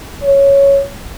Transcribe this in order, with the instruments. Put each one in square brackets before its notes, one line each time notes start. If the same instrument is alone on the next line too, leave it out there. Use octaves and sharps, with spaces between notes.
[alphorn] C#5